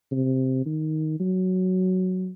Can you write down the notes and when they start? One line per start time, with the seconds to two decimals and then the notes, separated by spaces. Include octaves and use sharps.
0.12 C3
0.66 D#3
1.20 F#3